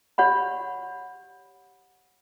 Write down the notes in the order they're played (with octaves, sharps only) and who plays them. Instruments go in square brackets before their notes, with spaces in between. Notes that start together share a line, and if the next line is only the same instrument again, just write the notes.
[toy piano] G4 C#5 F#5 B5